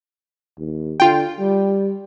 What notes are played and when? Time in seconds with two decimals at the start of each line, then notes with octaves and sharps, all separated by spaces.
0.59 D#2
1.00 D3 F4 G5
1.40 G3